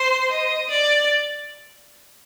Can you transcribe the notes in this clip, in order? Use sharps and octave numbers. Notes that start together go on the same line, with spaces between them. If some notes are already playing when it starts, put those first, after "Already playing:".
Already playing: C5 C6
D#5
D5